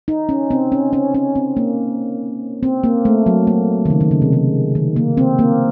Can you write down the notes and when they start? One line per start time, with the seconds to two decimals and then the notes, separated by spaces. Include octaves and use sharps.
0.08 D#4
0.29 C#4
0.51 C4
0.72 C#4
0.93 C#4
1.14 C#4
1.35 C4
1.57 A#3
2.63 C4
2.84 A#3
3.05 A3
3.26 F#3
3.47 A#3
3.85 D#3
3.90 C#3
4.01 D#3
4.11 C#3
4.22 C3
4.33 C#3
4.75 D#3
4.96 A#3
5.17 C4
5.39 A#3